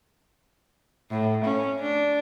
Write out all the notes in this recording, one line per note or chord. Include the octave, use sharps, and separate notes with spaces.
A2
C#4
D4